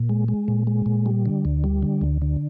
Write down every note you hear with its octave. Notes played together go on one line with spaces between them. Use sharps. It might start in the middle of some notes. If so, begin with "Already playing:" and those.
Already playing: A#2
G#3
G#3
A#2
G#3
A#2
G3
D3
D2
G3
D3
D2
D3